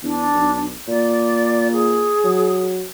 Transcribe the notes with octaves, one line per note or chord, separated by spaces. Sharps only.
E2 D4
B1
A#2 D5
G#4
F#3